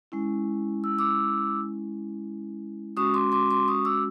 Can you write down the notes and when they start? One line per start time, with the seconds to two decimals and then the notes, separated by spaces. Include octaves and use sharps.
0.12 G#3 C#4 E4
0.84 E6
0.99 D6 E6
2.97 G#3 C#4 F#4 C#6 D#6
3.14 C6 D6
3.32 C6 D6
3.51 C6 D6
3.68 C#6 D#6
3.85 D6 E6